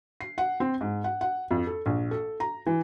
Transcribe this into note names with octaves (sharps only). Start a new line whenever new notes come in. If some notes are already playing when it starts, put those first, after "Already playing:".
C7
F#5
C4
G#2
F#5
F#5
F2
A4
A#1
A4
A#5
E3